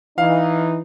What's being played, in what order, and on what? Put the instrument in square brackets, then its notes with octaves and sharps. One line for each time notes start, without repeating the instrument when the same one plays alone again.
[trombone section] E3 D#4 [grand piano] F5